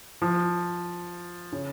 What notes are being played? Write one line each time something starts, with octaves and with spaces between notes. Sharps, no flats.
F3
C#3